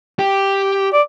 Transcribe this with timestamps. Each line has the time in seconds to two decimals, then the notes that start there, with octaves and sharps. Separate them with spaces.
0.19 G4
0.93 D5